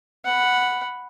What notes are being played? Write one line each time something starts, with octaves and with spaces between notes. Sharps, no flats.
F#5 B5